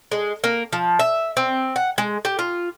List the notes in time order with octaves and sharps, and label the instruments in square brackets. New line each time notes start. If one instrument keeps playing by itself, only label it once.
[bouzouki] G#3
A#3
F3
E5
C4
F#5
G#3
G4
F4